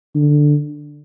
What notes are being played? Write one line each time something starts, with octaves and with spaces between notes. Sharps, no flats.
D3